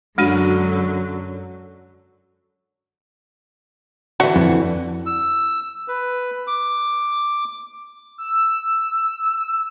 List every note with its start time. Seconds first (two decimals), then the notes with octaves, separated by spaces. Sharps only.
0.18 F#2 D3 F#3 G#3 D4 F#4
4.20 D3 E3 F#4 E5 F#5
4.36 F2
5.06 E6
5.88 B4
6.47 D6
8.18 E6